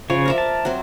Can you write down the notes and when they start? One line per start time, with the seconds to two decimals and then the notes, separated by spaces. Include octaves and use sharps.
0.10 C#3 F3 C#5
0.25 A#4 D5 E5
0.38 A5
0.65 F#3 C4